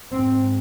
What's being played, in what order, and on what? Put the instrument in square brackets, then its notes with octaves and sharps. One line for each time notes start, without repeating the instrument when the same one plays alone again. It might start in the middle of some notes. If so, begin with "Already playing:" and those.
[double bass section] G#2 C4